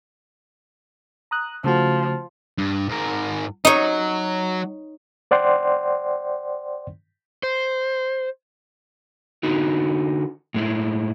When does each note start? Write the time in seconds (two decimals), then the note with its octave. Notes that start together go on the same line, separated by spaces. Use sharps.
1.31 A#5 D#6 F#6
1.64 C#3 F3 A3 F#4
2.58 G2
2.89 G#2 A#4
3.65 F#3 D#4 C#5
5.31 C5 D5 F#5 G5 C6
7.43 C5
9.43 D3 D#4 F#4
10.54 A2 G#3 E4